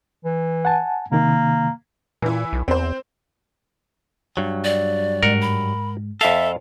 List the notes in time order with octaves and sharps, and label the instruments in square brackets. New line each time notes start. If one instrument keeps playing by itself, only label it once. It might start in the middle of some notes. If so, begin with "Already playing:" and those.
[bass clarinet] E3
[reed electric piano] F#5 G#5 A5
[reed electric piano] C3 D#3 [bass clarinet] A#3
[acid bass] A#2 [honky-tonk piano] E3 E4
[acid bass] B1
[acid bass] E2 [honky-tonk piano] C4 C5
[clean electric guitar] G2 F#3
[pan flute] D5
[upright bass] G#2 G#3 [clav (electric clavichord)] A#4 F#5
[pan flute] B5
[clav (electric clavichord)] F2 F5 [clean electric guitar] A4 [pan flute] E5